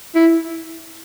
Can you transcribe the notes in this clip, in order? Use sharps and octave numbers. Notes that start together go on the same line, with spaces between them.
E4